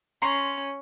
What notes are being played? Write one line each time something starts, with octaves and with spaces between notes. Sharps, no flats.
C#4 A#5 C6 C#6